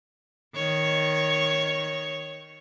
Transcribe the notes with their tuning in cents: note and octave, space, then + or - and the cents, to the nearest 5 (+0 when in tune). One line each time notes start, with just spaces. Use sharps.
D#3 +0 C#5 +0